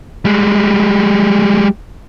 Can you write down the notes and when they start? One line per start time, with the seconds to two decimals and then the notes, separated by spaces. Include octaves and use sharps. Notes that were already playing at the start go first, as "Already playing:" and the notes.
0.25 G3 G#3